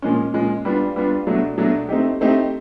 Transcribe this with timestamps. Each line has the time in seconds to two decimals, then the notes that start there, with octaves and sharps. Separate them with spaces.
0.02 A#2 F3 G#3 C#4
0.34 A#2 F3 G#3 C#4
0.65 G3 B3 D4 F4
0.96 G3 B3 D4 F4
1.27 B2 F#3 A3 D4
1.58 B2 F#3 A3 D4
1.89 A3 C4 D#4 G4
2.21 A3 C4 D#4 G4